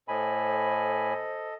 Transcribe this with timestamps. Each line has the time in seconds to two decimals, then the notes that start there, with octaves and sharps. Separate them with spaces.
0.08 A2 A4 C5 D#5 G#5 B5